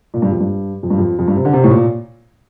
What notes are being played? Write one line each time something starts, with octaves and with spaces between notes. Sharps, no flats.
A#2
G2
F2
G2
F2
G2
F2
F2
G2
C3
D3
C3
A2
A#2